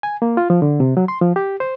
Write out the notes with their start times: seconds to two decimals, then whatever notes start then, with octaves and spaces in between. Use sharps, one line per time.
0.03 G#5
0.22 A#3
0.37 F4
0.50 F3
0.62 D3
0.80 C3
0.97 F#3
1.08 C6
1.21 F3
1.36 G4
1.60 C5